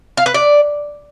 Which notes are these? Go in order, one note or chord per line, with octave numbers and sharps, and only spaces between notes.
F5
B4
D5